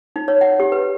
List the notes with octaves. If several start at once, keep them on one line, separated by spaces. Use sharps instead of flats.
D#4
C#5
F#5
G4
B4